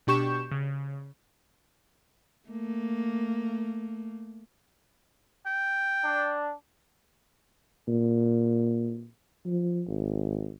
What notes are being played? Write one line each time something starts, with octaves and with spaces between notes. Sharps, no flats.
B2 D4 G4 C#6 G6 E7
C#3
A3 A#3
G5
D4
A#2
F3
G#1